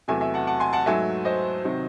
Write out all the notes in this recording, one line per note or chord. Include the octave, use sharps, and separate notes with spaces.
E2 C3 F#3 A3 E5 G#5
E5 G#5
F#5 A5
F#5 A5
G#5 C6
F#5 A5
G#2 F#3 A3 E5 G#5
C5 D#5
C3 D#3 F#3